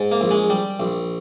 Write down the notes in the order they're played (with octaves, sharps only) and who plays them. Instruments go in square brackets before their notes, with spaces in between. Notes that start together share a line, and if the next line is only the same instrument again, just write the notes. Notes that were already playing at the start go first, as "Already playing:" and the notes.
Already playing: [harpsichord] G#2
A#3
A#1
G#3
G3
A#1